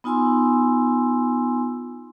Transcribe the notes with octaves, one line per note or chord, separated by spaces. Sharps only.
B3 D#4 F4 G#5 C6 E6